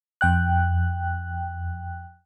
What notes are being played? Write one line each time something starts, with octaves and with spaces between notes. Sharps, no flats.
F2 G5 F#6